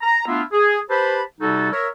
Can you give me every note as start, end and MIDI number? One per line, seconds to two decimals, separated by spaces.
0.01 0.25 82
0.27 0.42 57
0.27 0.42 59
0.27 0.42 62
0.27 0.42 64
0.27 0.42 65
0.52 0.79 68
0.89 1.22 67
0.89 1.22 71
0.89 1.22 72
0.89 1.22 81
0.89 1.22 83
1.40 1.71 48
1.40 1.71 55
1.40 1.71 63
1.40 1.71 66
1.40 1.71 69
1.72 1.88 70
1.72 1.88 73
1.72 1.88 76